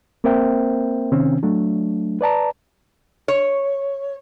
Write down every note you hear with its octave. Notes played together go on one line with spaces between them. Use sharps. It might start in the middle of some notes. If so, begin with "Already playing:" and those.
A#3 C4 A#4 C5 E5 G5
C3 D#3 C4 C#4
F#3 A3 D4
B4 D5 A5 A#5
C#5